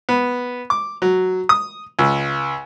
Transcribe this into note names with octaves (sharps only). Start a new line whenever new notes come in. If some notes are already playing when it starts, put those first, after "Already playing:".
B3
D6
F#3
D#6
C#2